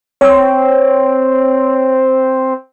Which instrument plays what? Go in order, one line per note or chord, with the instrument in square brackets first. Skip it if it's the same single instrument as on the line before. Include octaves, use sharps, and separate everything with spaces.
[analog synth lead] C4 [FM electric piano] C#5